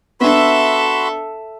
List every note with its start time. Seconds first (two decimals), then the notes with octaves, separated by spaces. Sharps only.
0.21 B3 D4 F#4 A4 E5 B5 C6